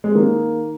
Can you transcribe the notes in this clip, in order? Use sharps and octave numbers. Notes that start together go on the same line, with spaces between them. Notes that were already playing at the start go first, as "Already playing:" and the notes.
G#3
D#3 A#3